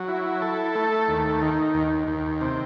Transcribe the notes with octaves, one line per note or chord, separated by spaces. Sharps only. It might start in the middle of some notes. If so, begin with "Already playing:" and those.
Already playing: F#3
E4
A4
A3
D#2
D#3
D#2
D#2
C3